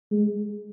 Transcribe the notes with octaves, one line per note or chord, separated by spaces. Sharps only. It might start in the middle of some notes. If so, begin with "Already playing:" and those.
G#3